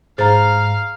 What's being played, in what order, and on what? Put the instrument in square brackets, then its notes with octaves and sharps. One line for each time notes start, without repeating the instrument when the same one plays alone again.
[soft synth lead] G#2 [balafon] G#4 C5 [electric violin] F5 F6 [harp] A#5 G6 A6